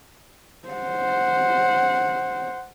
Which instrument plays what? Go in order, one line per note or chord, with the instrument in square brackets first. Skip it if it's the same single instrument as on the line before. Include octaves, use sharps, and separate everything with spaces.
[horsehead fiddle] C5 F#5